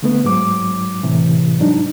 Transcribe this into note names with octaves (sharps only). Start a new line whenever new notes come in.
D3 A3 B3
G#2 F#3 D6
A2 C3 E3
G#2 F#3 D4 D#4